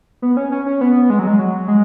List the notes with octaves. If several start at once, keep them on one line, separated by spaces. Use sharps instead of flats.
B3
C#4
C#4
C#4
B3
G#3
F#3
G#3
F#3
G#3